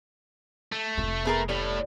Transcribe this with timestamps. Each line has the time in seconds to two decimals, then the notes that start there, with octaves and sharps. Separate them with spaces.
0.72 A3
0.98 F1 F4
1.25 B3 G#4 A#4
1.49 A2 G3